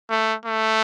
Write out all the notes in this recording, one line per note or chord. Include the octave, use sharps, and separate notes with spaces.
A3
A3